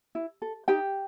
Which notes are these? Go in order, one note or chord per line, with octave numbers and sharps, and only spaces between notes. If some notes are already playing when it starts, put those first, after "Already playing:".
E4
A4
D#4 G4 G5